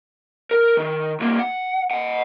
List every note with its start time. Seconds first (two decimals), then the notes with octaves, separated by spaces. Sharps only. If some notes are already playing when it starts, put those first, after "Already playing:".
0.51 A#4
0.77 D#3
1.20 C2 A#3
1.39 F#5
1.91 D#5 F#5